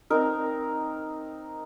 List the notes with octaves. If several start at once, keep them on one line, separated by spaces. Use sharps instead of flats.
C4 D#4 A#4